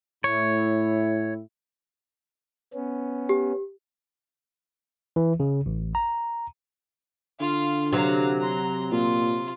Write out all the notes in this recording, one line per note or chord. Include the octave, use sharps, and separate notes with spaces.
A2 E4 C#5
B3 C#4
G4
E3
C#3
A1
A#5
D3 F4 F5
C3 F#3 F5 A#5
A#5 C6
A#2 F4